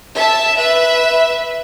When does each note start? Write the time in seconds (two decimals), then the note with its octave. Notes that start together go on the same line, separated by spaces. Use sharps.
0.17 E5 A5
0.57 B4 E5